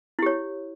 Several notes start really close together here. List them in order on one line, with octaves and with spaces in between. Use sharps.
E4 G4 C#5